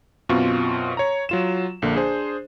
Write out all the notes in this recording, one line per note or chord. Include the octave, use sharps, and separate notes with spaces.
F#2 B2 C4 F4 C#6
C#5 A#5
F#3 F4 E7
A#1 D3 A#3
D4 G#4 C5